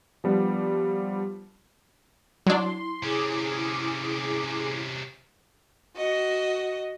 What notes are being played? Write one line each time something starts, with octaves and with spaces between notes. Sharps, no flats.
F3 G3 B3 D4
F#3 D4 E4 C6
C3 C#4 G#4 D6
F#4 D#5